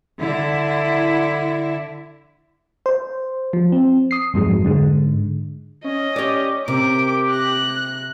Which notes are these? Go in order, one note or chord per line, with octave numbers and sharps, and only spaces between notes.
D3 E4
C5
F3
C4
D#6 C7
F2 G#2 F#3 G#3
G#2 D3 G#3
C#4 D#5
G4 C#5 D5
C3 G4 A#4 D6
F#6 A#6